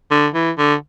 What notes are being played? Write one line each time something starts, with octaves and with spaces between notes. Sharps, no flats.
D3
E3
D3